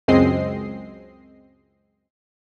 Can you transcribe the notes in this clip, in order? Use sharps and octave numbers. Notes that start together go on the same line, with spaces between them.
C#2 F#2 G#3 C4 D#5 C7